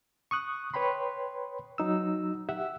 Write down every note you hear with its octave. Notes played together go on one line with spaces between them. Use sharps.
C#6 D#6 F#6
B4 C#5 G5 B5 C6
F#3 D#4 E6
G4 E5 F#5 E6